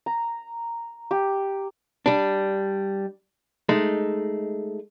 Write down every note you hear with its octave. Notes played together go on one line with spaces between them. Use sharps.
A#5
G4
G3 D4
G#3 A3 D#4